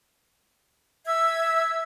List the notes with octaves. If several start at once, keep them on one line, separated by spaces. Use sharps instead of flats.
E5 E6 G#6